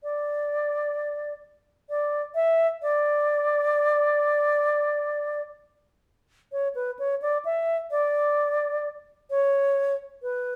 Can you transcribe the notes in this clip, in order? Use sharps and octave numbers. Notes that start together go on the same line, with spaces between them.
D5
D5
E5
D5
C#5
B4
C#5
D5
E5
D5
C#5
B4